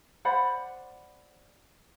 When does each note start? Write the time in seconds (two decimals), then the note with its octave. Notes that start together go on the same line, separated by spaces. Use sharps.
0.25 C5 D5 F#5 B5